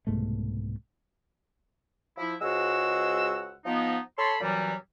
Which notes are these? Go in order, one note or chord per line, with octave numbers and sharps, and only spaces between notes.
C2 G#2 B2 A3
F3 E4
C#2 G#3 F#4 C5 F#5 E6
F3 B3 D#4
A4 C#5 A5 B5 C6
F#2 A#2 E3 F#3 G3